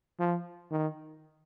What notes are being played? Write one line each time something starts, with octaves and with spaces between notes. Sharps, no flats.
F3
D#3